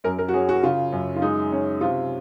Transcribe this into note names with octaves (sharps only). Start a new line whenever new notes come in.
F#2 A#4
A#4
F#4
C#4 G#4
F#4
C#3 F4
F#2
F4
G#3 D#4
C#4
C3 F4